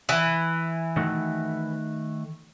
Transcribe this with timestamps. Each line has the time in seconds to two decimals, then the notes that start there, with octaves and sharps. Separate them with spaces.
0.09 E3
0.97 D#3 A3 F#4